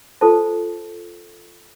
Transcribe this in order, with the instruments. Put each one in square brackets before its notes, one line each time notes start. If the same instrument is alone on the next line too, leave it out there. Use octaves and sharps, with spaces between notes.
[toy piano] F4 A4 C5 A5